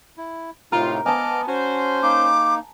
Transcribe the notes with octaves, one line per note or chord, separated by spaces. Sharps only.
E4
A2 C3 D#4 F4 A#4
B3 D#5 G#5 A5 D6 F6
C#4 F#4 C5
A#3 D#4 D6